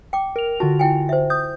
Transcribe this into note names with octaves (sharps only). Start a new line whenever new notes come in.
G5 D6
A#4 F7
D3 F4 F#4 A5
E4 G5 G#5
C5 E5
D#6 G6